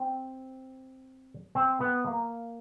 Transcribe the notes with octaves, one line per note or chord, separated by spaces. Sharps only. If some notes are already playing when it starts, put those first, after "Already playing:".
Already playing: C4
C4
B3
A#3